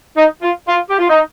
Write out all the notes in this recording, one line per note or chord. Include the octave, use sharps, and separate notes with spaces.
D#4
F4
F4
G4
F4
D#4